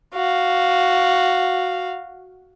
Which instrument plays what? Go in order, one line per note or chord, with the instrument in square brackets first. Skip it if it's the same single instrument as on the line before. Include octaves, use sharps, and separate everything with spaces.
[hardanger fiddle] F#4 F5